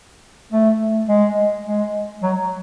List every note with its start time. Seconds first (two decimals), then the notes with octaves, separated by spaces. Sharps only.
0.52 A3
1.09 G#3
1.65 G#3
2.23 F#3